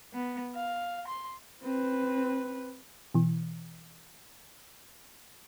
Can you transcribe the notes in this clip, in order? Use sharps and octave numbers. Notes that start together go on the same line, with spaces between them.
B3
F5
C6
C4 B4
B2 E3